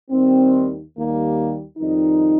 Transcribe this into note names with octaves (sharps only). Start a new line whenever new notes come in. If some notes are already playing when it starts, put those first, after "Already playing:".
D#2 D#3 G3 C4
D#2 D#3 G3 A#3
F2 D#3 G3 D#4